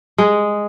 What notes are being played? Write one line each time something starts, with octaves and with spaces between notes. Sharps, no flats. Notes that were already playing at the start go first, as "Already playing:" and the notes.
G#3